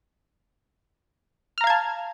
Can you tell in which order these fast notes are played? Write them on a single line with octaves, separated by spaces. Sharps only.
F6 A#5 F5 G#6 A5